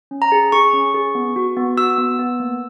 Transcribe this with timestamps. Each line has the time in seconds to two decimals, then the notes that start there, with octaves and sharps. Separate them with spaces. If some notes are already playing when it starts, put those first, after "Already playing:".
0.11 C#4
0.22 A#5
0.32 G#4
0.52 G#4 C#6
0.73 C#4
0.94 G#4
1.15 B3
1.36 F#4
1.57 B3
1.77 F#4 E6
1.98 B3
2.19 B3
2.40 A#3